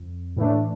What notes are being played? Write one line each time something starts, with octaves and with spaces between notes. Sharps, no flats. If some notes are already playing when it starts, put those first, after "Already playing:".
Already playing: F2
A2 E3 A3 D4